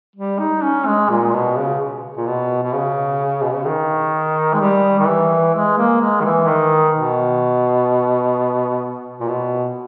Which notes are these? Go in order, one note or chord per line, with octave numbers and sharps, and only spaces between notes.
G3
D#4
C#4
G#3
A#2
B2
C#3
A#2
B2
B2
C#3
B2
C#3
D#3
G#3
G3
D#3
E3
G#3
A#3
G#3
D#3
E3
D#3
B2
A#2
B2